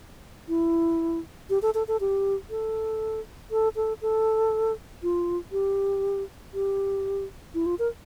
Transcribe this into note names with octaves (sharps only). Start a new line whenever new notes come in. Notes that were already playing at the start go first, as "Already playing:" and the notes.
E4
G4
A4
A4
A4
G4
A4
A4
A4
A4
F4
G4
G4
E4
F4
A#4